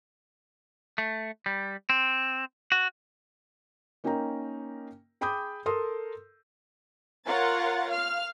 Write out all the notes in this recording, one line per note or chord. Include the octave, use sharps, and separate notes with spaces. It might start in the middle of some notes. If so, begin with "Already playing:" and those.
A3
G3
C4
F#4
A#3 C#4 D#4 A#4 G5 A#5
G#4 G5 B5 D6 D#6 G6
A4 A#4 C6 D#6
F4 A#4 C#5 F#5 A6
F5 F6